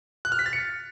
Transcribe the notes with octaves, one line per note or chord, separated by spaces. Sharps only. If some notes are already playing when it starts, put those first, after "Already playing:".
F#6
F6
B6
A6
C#7